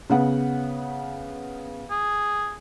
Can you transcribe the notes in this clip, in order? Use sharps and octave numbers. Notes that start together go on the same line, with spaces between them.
C#3 B3 F#5
G#4